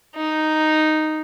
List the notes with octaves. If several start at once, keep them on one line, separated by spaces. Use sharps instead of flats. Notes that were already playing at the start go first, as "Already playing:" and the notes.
D#4